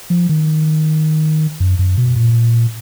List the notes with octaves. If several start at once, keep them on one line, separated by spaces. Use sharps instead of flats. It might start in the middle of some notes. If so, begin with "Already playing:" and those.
F3
D#3
F#2
F#2
B2
A#2